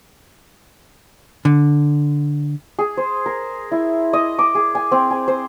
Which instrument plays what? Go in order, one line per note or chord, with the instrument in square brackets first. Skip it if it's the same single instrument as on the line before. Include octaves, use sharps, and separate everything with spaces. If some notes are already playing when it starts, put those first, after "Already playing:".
[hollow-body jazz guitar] D3
[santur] G#4
C5
A#4
E4
D#5
D6
G#4
G#5
C4
G#5
C5